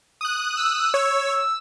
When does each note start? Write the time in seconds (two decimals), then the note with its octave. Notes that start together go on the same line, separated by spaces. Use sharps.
0.21 D#6 F#6
0.57 E6
0.94 C#5